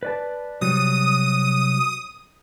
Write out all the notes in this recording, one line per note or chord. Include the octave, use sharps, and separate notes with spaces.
B4 D5 A5
C3 F#3 G3 D#6